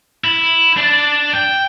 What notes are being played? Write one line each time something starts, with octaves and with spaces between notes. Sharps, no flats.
E4
D4 D5
G5